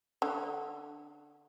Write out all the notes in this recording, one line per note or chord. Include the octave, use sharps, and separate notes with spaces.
D3